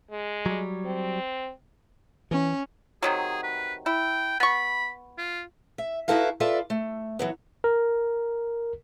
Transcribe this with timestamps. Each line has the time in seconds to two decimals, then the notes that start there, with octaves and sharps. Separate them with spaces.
0.11 G#3
0.46 F#3 G3
0.85 C4
2.31 E3 C#4
3.03 C3 D#3 F#3 G#4
3.43 B4
3.86 E4 G5
4.40 B3 B5 C#6
5.18 F4
5.78 E5
6.08 D#4 E4 F#4 A4 B4 F5
6.40 F4 A4 B4 D5 E5
6.70 A3
7.19 E3 F#3 B3
7.64 A#4